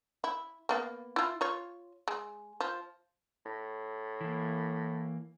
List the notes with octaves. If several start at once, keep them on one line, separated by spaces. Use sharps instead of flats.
E4
A#3 B3 F5
E4 F4
F4 C#5
G#3
F3
A2
E3 A#3